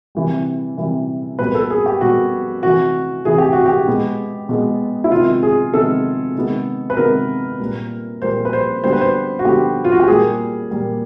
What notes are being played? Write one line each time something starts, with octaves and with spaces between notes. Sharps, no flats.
C3 E3 G3
C3 E3 G3
B2 G3 A#3 B4
A4
G#4
G4
B2 G3 A#3 F#4
C3 E3 A3 F#4
C3 E3 A3 G#4
G4
F#4
G4
B2 G#3 B3
B2 G#3 B3
E4
C3 D#3 G#3 B3 F4
G#4
C3 D#3 G#3 B3 A4
C3 D#3 G#3 B3
B4
C3 D#3 G#3 B3 A#4
A#2 G3 A#3
A#2 G3 A#3 C5
B4
C5
D3 G3 B3 C5
B4
C5
F#4
D3 G3 B3 G4
F4
F#4
G4
A#2 G3 A#3 G#4
A#2 G3 A#3